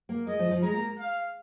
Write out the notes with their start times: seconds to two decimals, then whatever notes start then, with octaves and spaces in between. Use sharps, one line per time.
0.09 A#3
0.27 G#3 D#5
0.39 F3
0.51 F3
0.62 G#3 A#5
0.74 A#3
0.98 F5